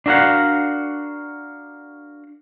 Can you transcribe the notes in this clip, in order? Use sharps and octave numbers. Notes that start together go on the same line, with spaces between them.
D4 F#4 A#4 F5 F#5